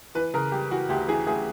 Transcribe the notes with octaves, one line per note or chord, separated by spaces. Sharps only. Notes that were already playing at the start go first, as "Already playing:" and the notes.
E3 B4
C#3 A#4
G3 G4
E3 F#4
D2 G4
E3 G#4
D2 G#4